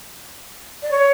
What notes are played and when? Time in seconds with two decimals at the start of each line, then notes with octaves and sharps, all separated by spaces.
0.83 D5
0.91 C#5